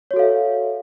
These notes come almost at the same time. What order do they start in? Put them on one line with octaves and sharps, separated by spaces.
C#5 F#4 A4 F5 E5